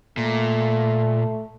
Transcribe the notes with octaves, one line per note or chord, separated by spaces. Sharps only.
A#2 A3